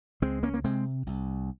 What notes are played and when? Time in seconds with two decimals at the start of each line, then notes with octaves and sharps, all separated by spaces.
0.22 C#2 G#3 C4
0.43 A#3 C#4
0.54 A#3
0.64 C3 G#3 C4
1.07 C2